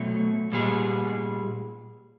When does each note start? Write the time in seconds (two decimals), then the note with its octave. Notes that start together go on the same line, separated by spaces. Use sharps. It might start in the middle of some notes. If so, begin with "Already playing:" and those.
Already playing: B2 F#3 A3
0.52 A#2 G3 G#4